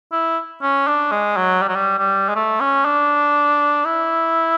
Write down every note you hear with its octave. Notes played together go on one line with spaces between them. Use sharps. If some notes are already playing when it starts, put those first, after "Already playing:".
E4
C#4
D4
G#3
F#3
G3
F#3
G3
G3
G#3
A3
C#4
D4
E4